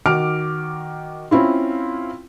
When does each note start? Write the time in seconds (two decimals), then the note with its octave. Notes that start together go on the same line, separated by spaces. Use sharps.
0.06 D#3 F#4 D6 F6 D7
1.31 C4 C#4 E4 F4